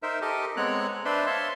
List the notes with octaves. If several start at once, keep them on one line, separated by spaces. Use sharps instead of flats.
D#4 A#4 C5 E5
G4 A4 A#4 D#5
G#3 B3 C4 C#5 A#5 F#6
D4 B4 C5 D5 E5 C6
C#5 E5 F5 A5 C6